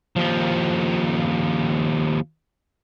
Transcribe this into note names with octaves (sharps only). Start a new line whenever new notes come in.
D#2 F3